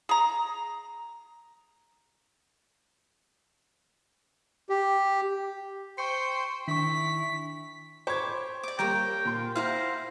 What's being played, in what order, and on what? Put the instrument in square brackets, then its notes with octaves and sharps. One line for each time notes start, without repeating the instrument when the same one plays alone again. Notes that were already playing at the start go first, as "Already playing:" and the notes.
[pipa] G#4 A#5
[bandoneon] G4
[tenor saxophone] C5 [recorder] G5 [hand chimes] C#6 C#7
[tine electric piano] D#3 [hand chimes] D4 C#6 [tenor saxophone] E4 [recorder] B6
[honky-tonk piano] C5 G#6 [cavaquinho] C#5 B5 D6
[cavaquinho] D5 D6
[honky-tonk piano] G3 A#3 [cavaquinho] A#4 C5 C#5 [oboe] G5
[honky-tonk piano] A#2 C6
[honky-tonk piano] E4 F6 [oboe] C5 [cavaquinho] F5 F#5 A#5